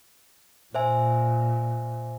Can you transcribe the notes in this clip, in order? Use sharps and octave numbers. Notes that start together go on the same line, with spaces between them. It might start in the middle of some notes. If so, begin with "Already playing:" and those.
A#2 C5 E5 G#5